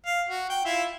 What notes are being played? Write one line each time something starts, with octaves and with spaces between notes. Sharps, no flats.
F5
F#4
G5
E4 F4 E5